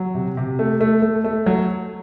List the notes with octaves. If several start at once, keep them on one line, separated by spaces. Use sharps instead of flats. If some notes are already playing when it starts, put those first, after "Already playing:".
Already playing: F#3
C3
C3
A3
A3
A3
A3
F#3